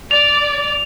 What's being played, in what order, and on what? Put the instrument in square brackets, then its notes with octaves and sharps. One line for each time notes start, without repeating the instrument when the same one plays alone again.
[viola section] D5 [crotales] F7